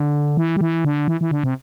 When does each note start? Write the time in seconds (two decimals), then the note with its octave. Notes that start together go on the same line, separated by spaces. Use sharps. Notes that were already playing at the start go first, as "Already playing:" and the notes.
Already playing: D3
0.37 E3
0.56 G3
0.61 E3
0.85 D3
1.08 E3
1.21 E3
1.31 D3
1.43 C3